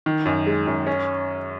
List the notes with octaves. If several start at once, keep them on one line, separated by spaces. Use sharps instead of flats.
D#3
F#2
G#3
F#2
C#4